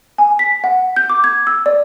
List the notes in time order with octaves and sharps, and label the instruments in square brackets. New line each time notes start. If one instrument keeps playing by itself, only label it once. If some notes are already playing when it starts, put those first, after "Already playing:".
[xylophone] G#5
B6
F#5
G6
D6
G#6
E6
D5